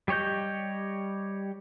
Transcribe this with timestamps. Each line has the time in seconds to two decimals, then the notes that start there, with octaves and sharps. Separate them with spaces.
0.08 G3 G4 C#5 D#5 G6